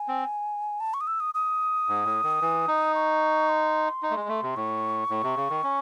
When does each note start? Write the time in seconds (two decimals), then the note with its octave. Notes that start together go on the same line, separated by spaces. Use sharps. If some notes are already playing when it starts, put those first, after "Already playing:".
Already playing: G#5
0.08 C4
0.80 A5
0.94 C#6
1.01 D#6
1.07 E6
1.20 D#6
1.34 D#6
1.88 G#2
2.05 A2
2.23 D#3
2.41 E3
2.68 D#4
2.95 C#6
3.49 C6
4.03 D#4
4.11 A3
4.16 G#3
4.28 A3
4.42 C3
4.56 A2 C#6
5.10 A2
5.23 C3
5.36 C#3
5.50 D#3
5.64 C#4